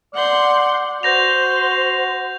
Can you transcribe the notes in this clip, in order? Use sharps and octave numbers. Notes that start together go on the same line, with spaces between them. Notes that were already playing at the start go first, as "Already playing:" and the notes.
D5 F#5 C6 G6
F#4 C5 G6 A#6 F7